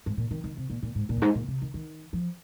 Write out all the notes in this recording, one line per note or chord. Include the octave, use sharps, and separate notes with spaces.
G#2
A#2
D#3
D#3
C3
A#2
A#2
G#2
A#2
F2
G#2
A#2
C3
D#3
D#3
F3